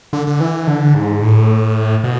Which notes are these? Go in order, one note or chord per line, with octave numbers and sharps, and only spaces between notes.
D3
D3
E3
D3
G#2
A2
B2